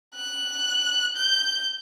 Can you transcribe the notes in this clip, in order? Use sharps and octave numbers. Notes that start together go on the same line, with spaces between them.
F#6
G6